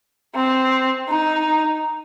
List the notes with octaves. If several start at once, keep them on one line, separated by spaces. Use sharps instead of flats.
C4
D#4